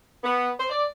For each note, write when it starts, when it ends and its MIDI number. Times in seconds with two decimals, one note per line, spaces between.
0.24 0.50 59
0.59 0.66 72
0.70 0.84 74